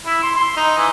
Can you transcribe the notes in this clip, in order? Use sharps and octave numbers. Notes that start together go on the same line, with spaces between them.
E4
C6
C6
D#4
E3